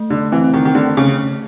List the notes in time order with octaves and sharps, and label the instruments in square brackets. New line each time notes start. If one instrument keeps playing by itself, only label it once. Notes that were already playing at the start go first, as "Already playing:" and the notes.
Already playing: [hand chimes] A3
[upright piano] D3
[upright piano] E3 [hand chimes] C4
[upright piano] D#3
D#3
[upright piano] D3 [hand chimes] A3
[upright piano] C#3